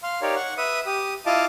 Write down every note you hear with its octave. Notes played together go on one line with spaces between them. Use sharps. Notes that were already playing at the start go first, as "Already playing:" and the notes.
F5 C6
D#4 G4 A#4 C#5 D5 F5
F#5 C#6
B4 E5 D#6
G4 D#6
E4 F4 D#5 F5 A5 D6